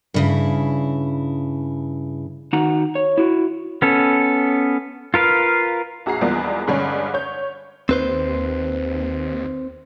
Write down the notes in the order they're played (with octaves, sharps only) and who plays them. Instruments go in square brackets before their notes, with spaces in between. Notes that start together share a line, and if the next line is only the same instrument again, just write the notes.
[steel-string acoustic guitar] G2 C#3 E4
[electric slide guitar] D#3 D#4 F#4 F#5 A#5
C#5
E4 F#4
[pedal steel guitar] B3 C#4 A4
F4 A#4 B4 F5
[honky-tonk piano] A#1 F#4 G#4 A#5 C7
E2 F3 G3 G#3 A#3 B3
G2 D3 G3 G#3 C#4
C#5 G6
[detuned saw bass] D#2 [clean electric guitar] C4 B4 C5